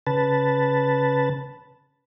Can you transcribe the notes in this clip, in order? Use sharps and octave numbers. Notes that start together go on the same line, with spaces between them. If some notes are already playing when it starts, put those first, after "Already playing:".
C#3 B4 A5